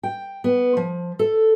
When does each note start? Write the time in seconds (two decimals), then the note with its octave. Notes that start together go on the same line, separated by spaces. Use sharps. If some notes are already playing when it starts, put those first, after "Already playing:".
0.03 G5
0.44 B3
0.77 F3
1.19 A4